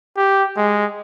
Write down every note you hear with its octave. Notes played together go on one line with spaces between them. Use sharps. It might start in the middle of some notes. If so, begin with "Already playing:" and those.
G4
G#3